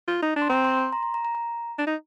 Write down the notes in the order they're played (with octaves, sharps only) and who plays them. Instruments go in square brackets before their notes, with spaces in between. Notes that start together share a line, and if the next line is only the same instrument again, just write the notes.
[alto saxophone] F4
D#4
D4
[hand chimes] C6
[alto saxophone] C4 [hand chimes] A#5
[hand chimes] C6
C6
A#5
A#5
A#5
A#5
A#5
[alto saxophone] D4
D#4